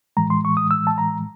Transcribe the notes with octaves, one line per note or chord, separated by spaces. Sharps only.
A2 E3 G#3 A#5
C6
C#6
D#6
E6
A5
A#5